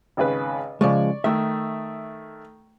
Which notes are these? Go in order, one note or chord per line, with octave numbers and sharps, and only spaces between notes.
G#1 C#3 B4
C#3 F3 G#3 D5 C#6
D#3 A3 E5